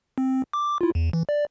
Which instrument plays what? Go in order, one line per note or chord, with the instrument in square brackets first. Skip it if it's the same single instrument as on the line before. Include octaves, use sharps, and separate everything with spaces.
[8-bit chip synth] C4
D6
E4 F4
E2
E3
D5